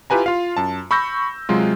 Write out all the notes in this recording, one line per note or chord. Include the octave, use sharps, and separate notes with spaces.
E4 F4 G4 B4 G#5 A#5
F4 F5
F#2 A5
B5 C#6 E6 G6 A#6
C3 F#3 G#3 F4